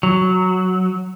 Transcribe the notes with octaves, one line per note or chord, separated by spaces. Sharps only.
F#3